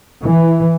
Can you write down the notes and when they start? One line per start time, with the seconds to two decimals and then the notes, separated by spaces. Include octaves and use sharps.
0.22 E3